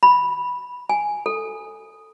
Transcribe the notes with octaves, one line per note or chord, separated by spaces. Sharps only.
B5
G#5
A4